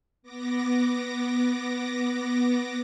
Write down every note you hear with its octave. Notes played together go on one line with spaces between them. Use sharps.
B3 D6 A#6